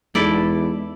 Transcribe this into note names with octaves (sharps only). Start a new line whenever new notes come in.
E2 G#3 B3 D#4 E4 A4 D5